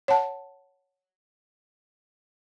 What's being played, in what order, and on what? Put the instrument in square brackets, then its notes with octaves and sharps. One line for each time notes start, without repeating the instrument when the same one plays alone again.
[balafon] C#5 F#5 A5